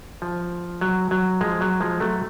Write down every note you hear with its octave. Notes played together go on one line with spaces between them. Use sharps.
F3
F#3
F#3
F3 G#3
F#3
F3 G#3
F#3 A3